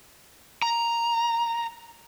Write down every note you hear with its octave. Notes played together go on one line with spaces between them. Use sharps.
A#5